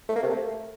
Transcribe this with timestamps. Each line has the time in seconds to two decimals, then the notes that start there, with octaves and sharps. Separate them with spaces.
0.09 A3
0.16 A#3
0.23 C3
0.30 A3